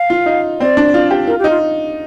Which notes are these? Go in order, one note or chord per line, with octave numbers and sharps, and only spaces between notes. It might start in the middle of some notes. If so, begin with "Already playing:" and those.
Already playing: F5
F4
D#4
C4 D5
D4
F4
G4
F4 A#4
G4
D#4
F4